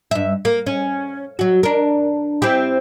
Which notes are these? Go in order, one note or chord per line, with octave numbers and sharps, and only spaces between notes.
G2 E5
A#3
C#4
F#3 F#4
D4 A#4
C4 E4 G4